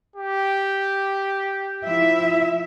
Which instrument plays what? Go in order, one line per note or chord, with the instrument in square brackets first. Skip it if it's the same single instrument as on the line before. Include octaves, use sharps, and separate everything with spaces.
[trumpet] G4
[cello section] F3 E4 E5